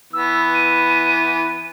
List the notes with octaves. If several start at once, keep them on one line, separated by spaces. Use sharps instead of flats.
E3 B3 E6
D#7